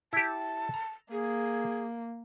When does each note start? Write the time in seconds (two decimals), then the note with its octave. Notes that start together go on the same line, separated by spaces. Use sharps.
0.13 E4 G4 A5
0.74 A#5
1.12 A#3 G#4